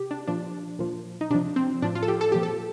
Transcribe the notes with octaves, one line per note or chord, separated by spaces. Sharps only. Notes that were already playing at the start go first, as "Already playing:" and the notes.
Already playing: C3 G4
D4
A#2 F3 D4
A#2 F3
D#4
C3 F3 D4
C4
A2 F3 D4
F4
A4
G4
A4
A#2 F3 G4
A4